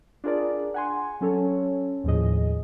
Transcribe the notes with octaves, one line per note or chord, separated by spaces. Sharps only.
D4 F4 G#4 A#4 D5
F#5 G#5 C6
F#3 C#4 A4 C#5
D#2 A2 F3 G#4 D#5